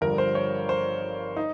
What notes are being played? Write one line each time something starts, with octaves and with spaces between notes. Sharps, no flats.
G1 G2 F3 A#4
C5
C#5
C5
D#4